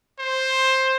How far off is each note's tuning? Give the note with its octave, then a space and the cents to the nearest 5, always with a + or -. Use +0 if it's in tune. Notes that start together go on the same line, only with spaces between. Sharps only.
C5 +10